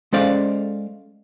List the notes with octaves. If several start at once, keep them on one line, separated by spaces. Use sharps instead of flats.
G#3 C#4 A4 C5 D5 F5